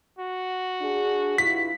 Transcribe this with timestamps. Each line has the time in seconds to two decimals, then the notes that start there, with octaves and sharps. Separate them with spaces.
0.19 F#4
0.82 D4 G#4
1.38 G2 E4 F4 B6